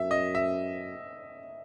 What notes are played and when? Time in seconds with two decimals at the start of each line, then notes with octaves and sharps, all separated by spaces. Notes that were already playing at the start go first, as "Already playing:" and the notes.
Already playing: F#2 E5
0.11 D#5
0.35 E5